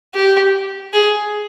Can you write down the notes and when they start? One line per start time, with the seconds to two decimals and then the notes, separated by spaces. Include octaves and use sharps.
0.14 G4
0.93 G#4